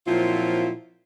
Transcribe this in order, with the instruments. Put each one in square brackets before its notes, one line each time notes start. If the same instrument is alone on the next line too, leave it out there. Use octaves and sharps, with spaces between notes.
[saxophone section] A#2 F3 F#3 C4 E4 F4